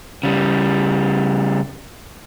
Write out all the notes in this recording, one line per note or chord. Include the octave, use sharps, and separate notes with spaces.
C#3 G3